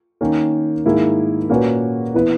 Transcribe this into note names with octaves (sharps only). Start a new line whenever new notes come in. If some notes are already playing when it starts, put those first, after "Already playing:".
D#3 A#3 C#4
G#2 D#3 A#3 E4 G#4
A#2 A#3 C#4 F#4 B4
E3 B3 E4 B4